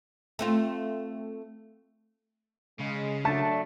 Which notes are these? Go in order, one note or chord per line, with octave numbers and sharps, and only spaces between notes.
A3 C4 F4
C#3 G#3
F#3 A3 D4 A5